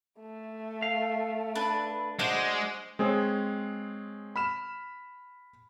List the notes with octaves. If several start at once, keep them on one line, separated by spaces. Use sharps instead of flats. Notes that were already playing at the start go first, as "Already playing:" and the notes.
A3
F5
D4 B4
G#3 D4 F#4 C5
G#3 C4 G#4 C#5
B5 F6 E7